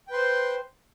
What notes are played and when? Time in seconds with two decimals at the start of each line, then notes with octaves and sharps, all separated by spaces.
0.07 G5
0.10 B4
0.13 C6
0.16 C5